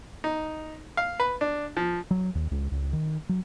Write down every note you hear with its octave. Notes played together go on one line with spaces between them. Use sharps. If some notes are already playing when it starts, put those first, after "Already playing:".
D#4
F5
B4
D4
F3
F#3
D#2
C#2
C#2
D#3
F#3